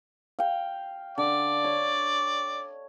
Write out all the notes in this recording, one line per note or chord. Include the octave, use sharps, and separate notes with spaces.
F5 G5
D3 D5
C#5